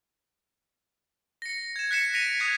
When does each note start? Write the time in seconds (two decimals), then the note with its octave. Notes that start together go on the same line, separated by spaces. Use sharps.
1.42 A#6 C#7
1.76 G#6 E7
1.91 F#6 B6 C#7 E7
2.14 A#6 B6 D7 D#7 F7
2.40 D#6 F#6 G#6 C7